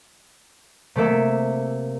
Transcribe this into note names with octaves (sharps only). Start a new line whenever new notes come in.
C3 A3 A#3 E5